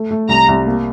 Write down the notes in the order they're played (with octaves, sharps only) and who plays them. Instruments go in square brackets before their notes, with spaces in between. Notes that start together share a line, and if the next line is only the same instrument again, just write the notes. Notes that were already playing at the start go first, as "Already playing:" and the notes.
Already playing: [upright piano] A3
A3
[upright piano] C2 [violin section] A#5
[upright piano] C2
A#3